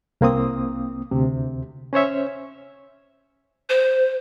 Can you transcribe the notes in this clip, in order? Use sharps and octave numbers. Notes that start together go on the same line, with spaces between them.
C2 A#3 C4 D#6
D2 C3
C#4 C5 C#5 E5
C5